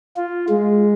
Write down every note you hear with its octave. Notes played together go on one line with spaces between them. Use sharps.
F4
G#3